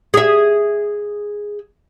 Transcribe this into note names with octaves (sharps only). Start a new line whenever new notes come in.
G#4 E5